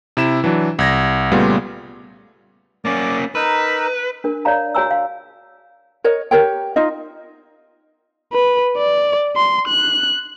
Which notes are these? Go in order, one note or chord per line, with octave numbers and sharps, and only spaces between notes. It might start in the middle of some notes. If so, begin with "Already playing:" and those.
C3 E4 E7
E3 F#3 D4
C2 G#6 A#6
A#2 C#3 G3 A3 B3 F4
A#3 C#4 D5 D6
D#4 A#4 B4 E6
D4 A#4
C#5 D5 F5 A#5
F#4 C#5 G#5 A#5 E6
F5
A#4 C#5 D#5
G4 A#4 C#5 G5
D#4 F4 D#5
B4
D5
C6
F#6